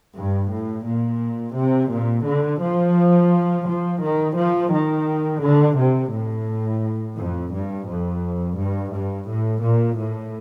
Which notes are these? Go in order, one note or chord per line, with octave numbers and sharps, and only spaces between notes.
G2
A2
A#2
C3
A#2
D3
F3
F3
D#3
F3
D#3
D3
C3
A2
F2
G2
F2
G2
G2
A2
A#2
A2